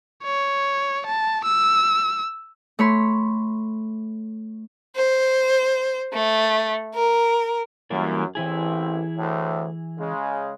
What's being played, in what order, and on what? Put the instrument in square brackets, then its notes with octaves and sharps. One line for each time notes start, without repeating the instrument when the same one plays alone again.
[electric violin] C#5
A5
E6
[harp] A3 C#5 B5 C6
[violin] C5
A3
A#4
[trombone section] F#2 [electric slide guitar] E3 G3 A#3
[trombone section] A1 C4 [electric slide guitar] E3 E4 G#4
[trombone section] D2 A2
C#3 G#3